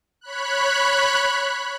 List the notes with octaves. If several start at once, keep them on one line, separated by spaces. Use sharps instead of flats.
C#5 B5 F#6